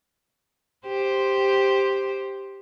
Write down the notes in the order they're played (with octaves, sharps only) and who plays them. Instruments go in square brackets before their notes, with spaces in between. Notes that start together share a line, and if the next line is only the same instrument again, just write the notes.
[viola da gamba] G4 C5